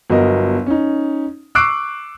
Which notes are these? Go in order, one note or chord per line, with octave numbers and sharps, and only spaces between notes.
G1 F#3 B3 A#4 D#5
C#4 D#4
C#6 D6 E6 F#6 C7 D7